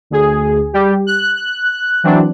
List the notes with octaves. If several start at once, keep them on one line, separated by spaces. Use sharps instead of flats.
D2 G#4
G3 G4
F#6
E3 F#3 C4 D4